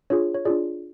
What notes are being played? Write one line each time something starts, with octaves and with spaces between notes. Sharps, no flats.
D4 F4 G#4 C#5
C#5
D4 F4 G#4 D5